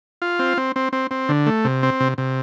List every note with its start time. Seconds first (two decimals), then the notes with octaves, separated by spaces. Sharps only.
0.22 F4
0.39 C4
0.57 C4
0.76 C4
0.93 C4
1.11 C4
1.29 D3
1.46 A3
1.65 C3
1.83 C4
2.00 C3
2.18 C3